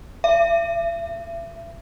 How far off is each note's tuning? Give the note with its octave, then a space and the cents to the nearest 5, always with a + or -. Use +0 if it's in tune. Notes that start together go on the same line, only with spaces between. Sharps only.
E5 +35